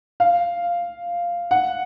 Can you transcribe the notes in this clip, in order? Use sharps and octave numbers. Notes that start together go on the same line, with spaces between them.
F5
F#5